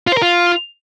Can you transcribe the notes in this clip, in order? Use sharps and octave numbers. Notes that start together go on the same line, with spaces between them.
F4
C5
A#4
F4